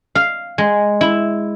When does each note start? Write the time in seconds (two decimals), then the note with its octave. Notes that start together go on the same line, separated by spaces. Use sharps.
0.15 F5
0.58 G#3
1.01 E4